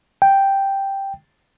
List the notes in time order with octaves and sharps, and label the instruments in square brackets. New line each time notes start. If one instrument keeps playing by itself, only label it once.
[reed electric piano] G5